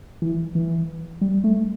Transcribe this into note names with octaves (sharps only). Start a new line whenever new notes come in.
E3
E3
G3
A3